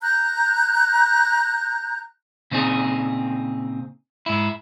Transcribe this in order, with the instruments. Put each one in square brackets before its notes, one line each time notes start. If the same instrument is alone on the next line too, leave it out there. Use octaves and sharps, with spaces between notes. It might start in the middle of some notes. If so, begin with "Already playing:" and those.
[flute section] A#5 F#6 G6
[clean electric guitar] A#2 C#3 C4 D#4 G#4
G#2 E4